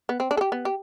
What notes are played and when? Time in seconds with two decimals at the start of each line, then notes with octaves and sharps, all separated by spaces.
0.09 B3
0.20 C4
0.31 D4
0.37 A4
0.41 G4
0.52 B3
0.65 G4